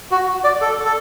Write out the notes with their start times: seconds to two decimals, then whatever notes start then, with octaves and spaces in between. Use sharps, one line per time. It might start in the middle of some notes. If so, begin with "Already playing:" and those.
0.11 F#4
0.44 D5
0.61 A4
0.85 A4